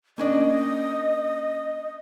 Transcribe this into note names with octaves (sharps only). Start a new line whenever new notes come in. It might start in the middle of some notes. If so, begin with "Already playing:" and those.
A#3 C#4 D4 D#5